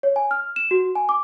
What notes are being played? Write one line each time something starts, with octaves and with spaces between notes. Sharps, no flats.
C#5
G#5
F6
E7
F#4
G#5
D6